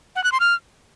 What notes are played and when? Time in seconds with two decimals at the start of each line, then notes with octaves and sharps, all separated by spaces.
0.16 F#5
0.24 F#6
0.32 C6
0.40 F6